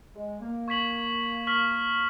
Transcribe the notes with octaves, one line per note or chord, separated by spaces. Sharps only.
G#3
A#3
C#6 G#6 B6 F#7
C#6 F6 B6 F#7